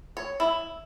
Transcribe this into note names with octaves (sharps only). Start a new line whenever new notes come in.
C#5
E4